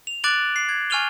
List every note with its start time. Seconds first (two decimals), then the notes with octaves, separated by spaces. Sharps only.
0.07 F7
0.24 D6 F#6 A6 D7 E7 F#7
0.56 C7
0.69 G#6
0.90 G#5 C#6 F6 D#7 F7 G7